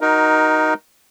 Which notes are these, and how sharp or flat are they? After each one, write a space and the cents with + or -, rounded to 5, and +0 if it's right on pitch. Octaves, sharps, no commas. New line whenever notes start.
D#4 +0 F#4 +0 A#4 +20